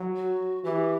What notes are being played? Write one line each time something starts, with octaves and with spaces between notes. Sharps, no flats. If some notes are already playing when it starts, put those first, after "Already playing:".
Already playing: F#3
F#4
E3 G4